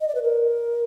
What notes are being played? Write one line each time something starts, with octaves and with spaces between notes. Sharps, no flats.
D#5
D5
B4
A#4